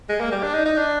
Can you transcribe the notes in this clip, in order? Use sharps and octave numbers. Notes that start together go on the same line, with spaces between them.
G#3
A#3
G3
D4
D#4
D#4
D4